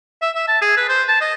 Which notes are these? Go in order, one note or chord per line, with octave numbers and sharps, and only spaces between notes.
E5
E5
A5
G#4
B4
C5
A5
D#5